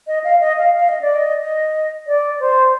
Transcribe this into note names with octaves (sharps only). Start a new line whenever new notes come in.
D#5
F5
D#5
F5
F5
D#5
D5
D#5
D#5
D5
C5